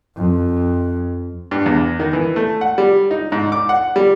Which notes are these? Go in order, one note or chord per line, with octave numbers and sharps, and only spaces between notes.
F2
G2
E2
D#3
E3
A3
F#5
G3
D#4
G#2
D6
F#5
G3